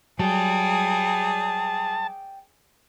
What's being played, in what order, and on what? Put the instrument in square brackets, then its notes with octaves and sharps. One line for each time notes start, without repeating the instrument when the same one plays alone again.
[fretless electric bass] F#3 G3 [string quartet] G#4 [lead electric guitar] D5 G5 [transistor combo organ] A5